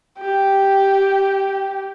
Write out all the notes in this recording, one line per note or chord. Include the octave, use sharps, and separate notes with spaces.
G4